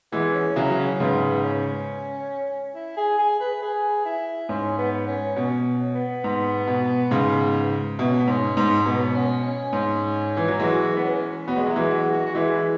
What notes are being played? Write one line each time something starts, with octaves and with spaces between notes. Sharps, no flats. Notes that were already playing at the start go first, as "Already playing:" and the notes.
E3 G#3 B3
C#4
C#3 F#3 E4
C#4
G#2 C#3 B3
C#4
E4
G#4
G#4
B4
G#4
E4
G#2 C#4
B3
C#4
B2 C#4
B3
G#2
B2
G#2 C#3
B2 E4
C#4
B3
G#2 C#4
G#2
B2 B3
C#4
C#4
G#2
E3
F#3
E3 G#3 F#4
B3
C#4
B3 F#4
G#3
F#3 E4
E3 G#3
F#4
F#4
F#4
E3 G#3 E4